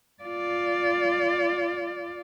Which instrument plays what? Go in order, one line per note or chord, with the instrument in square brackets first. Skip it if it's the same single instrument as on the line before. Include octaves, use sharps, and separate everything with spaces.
[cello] F4 D5